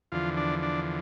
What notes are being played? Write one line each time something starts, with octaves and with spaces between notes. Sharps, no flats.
E2 D3 F3 F4
D4
D4